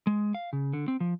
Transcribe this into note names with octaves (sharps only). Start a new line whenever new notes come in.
G#3
F5
C#3
D3
C4
F3